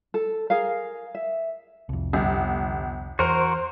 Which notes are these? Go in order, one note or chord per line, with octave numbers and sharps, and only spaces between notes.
A4
G#4 A#4 F5
E5
C2 F2
G1
E2 F#4 A#4 C5